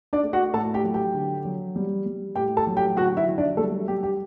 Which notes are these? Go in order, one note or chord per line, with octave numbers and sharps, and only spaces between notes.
D4 D5
A3
F#4 F#5
A2 A4 A5
G4 G5
F#3
G4 G5
D3
F#3
G3
G3
A2 G4 G5
A4 A5
F#3
G4 G5
D3 F#4 F#5
E4 E5
F#3
D4 D5
G3 A3 A4
G3 G4
G4